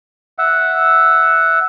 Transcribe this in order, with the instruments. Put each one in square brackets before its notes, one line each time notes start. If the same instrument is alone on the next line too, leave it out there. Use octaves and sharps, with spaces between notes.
[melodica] E5 F#5